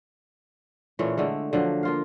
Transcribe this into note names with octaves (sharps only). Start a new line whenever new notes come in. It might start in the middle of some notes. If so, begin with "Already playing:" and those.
A#2 E3 A3 C#4
D3 G#3 A3
D3 F3 F#3
A#3 F4 F5